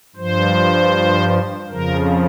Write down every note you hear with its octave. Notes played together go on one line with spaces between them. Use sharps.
G2 F3 C5
F2 C#3 F3 A#4